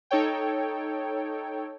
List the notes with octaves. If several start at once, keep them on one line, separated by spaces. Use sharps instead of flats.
D#4 A4 C#5 G5